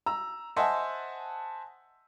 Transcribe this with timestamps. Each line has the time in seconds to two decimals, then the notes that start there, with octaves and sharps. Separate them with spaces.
0.06 A#5 E6
0.56 C5 D#5 E5 F#5 G#5 A5